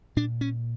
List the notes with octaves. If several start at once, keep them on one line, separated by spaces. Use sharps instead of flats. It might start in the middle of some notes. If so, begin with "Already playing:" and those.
A#2 D4
C#4